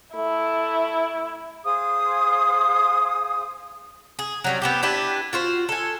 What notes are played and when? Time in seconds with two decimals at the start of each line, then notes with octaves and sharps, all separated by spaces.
0.15 A3 E4
1.65 G#4 C5 F5 D#6
4.19 G#4
4.44 F#3 G3 C#4
4.62 B3 C4 G4
4.83 D4 E4 G4 B4
5.33 F4 F#4 C5
5.69 A4 G#5